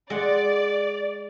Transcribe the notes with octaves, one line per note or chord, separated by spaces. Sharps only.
G#3 D5 F#5